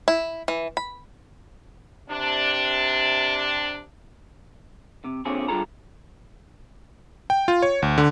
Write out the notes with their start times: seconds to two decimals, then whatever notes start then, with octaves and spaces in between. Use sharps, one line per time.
0.08 E4
0.48 E3
0.77 B5
2.10 C3 D4
5.04 C3
5.25 A#2 D3 C4 C#4 G#4
5.48 G2 D3 F4 G#4 A4 A#5
7.30 G5
7.48 F4
7.62 C#5
7.82 D2
7.98 D3